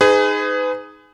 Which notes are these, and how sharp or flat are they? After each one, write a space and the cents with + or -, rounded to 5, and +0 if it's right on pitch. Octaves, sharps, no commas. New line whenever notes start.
D#4 +0 G#4 +0 B4 +40